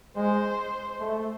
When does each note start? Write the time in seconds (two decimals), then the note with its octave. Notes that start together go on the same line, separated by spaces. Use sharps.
0.16 G#3 C5
1.00 A3